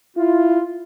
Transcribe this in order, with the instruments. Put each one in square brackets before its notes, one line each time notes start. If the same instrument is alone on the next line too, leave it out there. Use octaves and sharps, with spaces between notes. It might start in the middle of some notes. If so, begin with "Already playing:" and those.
[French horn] E4 [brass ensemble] F4